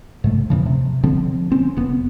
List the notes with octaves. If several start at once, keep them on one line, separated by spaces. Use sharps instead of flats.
G#2 C3 A3
E2 C#3 F3
C3
D3 F3 C4
C4 C#4
F1 B3